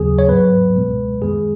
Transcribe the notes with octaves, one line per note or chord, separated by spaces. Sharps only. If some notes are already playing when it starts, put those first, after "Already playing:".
Already playing: D#2 C#3 F#3 B3 G#4
C#5
G#2 F#3 B3 B4
C#2 B2 G#3
F#2 D#3 G#3 B3 G#4